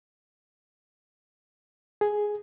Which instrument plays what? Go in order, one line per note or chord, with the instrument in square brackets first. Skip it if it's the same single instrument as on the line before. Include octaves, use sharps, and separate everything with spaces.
[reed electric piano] G#4